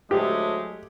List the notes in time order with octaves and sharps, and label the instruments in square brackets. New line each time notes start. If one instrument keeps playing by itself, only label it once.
[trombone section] D2 F#3 A3 [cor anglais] G#3 [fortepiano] G4